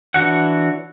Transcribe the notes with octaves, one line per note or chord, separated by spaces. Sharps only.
E3 D4 F#4 C#5 F#5